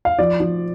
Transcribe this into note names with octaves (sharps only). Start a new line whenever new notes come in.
F5
F3 D5
F3